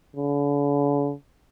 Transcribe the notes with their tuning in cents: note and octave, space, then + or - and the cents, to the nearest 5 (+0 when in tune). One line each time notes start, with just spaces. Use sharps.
D3 -45